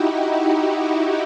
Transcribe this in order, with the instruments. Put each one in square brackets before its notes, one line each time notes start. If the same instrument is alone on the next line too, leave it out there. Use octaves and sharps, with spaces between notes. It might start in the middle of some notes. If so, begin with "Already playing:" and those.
Already playing: [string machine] D#4 E4 F#4 G4